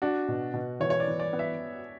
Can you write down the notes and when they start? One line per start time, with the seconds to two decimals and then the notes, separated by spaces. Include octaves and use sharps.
0.02 D4 F#4
0.28 B2
0.54 B2
0.80 E3 C#5
0.90 C#5
1.00 D5
1.07 E3
1.20 D5
1.33 B3
1.39 E5